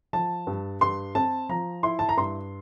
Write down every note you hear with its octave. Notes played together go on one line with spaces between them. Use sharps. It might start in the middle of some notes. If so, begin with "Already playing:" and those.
F3 A5
G2
G2 C6
C4 A5
F3 A#5
E4 C6
A5
A#5
G2 C6